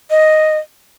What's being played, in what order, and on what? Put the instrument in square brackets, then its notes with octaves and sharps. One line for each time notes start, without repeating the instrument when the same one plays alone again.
[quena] D#5